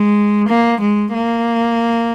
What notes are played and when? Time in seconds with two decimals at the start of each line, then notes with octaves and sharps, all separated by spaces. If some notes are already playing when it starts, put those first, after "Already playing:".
Already playing: G#3
0.48 A#3
0.80 G#3
1.14 A#3